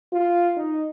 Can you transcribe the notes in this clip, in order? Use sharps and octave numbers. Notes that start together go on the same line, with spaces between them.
F4
D#4